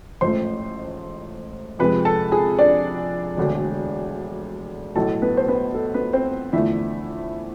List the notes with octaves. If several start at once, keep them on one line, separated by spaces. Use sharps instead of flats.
A1 G#2 F3 A3 C5 C6
F2 C3 G#3 B4 B5
A4 A5
G#4 G#5
D4 D5
E1 D2 D3
B1 A2 E3 A4 A5
B3 B4
C5
B3 B4
A4
B3 B4
C4 C5
E2 D3 F3 A3 E4 E5